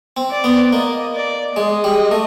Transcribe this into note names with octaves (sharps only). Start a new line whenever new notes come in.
C4
D5
B3
A#3 D#5
D5
G#3 D#5
G3
A3